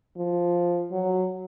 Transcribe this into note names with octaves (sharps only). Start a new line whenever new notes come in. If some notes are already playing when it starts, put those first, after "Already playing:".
F3
F#3